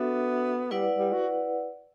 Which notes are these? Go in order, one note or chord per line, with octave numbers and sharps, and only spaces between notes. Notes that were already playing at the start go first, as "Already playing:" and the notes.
Already playing: B3 D4 F#4 A4 E5
G3 E4 B4 D5 F#5
G3
F#4